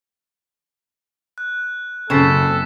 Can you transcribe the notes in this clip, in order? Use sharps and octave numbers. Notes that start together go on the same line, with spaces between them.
F#6
F#1 C#3 C4 A4 A6 B6 E7